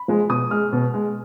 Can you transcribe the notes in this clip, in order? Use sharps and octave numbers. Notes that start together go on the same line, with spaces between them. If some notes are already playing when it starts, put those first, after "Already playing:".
Already playing: B5
F3 G#3
B2 D#6
G#3 F6
B2
G#3